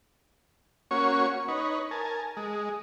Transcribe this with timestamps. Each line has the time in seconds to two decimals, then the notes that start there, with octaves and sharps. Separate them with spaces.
0.91 A#3 C#4 F#4 C#5 C#6
1.48 D#4 B4 C#5
1.91 A#4 G#5 A5
2.37 G#3